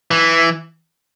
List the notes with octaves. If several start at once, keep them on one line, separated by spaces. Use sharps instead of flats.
E3